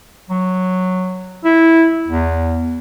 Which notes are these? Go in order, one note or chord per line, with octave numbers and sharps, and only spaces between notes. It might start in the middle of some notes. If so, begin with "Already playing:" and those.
F#3
E4
E2